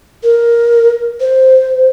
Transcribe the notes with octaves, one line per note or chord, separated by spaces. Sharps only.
A#4
C5